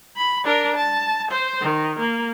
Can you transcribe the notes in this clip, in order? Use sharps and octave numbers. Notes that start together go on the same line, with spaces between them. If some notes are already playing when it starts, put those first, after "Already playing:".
B5
D4 A#4
A5
C5
D#3
A#3